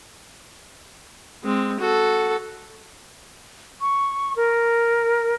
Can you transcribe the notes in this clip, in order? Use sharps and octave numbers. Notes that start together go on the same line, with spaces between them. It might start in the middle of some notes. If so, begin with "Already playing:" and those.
G#3 C4
F#4 A4
C#6
A#4